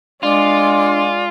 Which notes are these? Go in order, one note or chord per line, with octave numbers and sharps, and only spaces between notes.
G#3 D4 F4 D5 C6